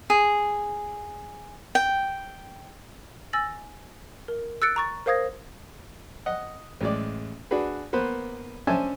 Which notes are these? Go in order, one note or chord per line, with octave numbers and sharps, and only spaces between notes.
G#4
G5
G#5 E6 A6 A#6 F#7
A#4
E6 F#6 A6 C#7 D7
A#5 C#6 A6
A#4 C5 F5 D#6 G#6 A#6
D#5 F#5
A1 G#3 D5
D4 F#4 G#4 B4
A#3 B3 B4 C5
C#4 D4 C5 E5 G#5 A5